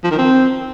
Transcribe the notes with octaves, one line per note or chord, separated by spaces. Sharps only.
F3
D#3
C4